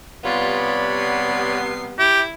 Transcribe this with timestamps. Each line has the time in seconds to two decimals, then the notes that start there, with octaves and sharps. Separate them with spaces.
0.24 C3 G3 B3 F4 C#5 D5 B5
0.93 C7
1.99 E4 G4